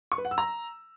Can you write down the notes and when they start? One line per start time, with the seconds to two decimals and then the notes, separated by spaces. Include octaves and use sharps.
0.12 C#6
0.18 B4
0.25 F#5
0.31 E6
0.38 A#5